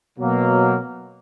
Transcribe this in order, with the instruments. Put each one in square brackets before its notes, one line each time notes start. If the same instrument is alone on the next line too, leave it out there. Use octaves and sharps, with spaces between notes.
[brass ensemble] B2 F#3 A#3